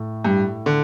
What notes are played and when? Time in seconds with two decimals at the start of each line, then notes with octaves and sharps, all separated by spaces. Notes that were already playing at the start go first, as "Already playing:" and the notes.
Already playing: A2
0.25 G2
0.66 D3